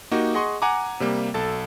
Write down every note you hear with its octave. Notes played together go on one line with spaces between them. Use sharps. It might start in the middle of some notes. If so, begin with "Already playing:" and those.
A#3 D#4 F#4 G4
G#4 D#5 F#5 C6 C#6
F#5 G#5 A#5 D6
C3 G3 A#3
B1 A4 A5 A6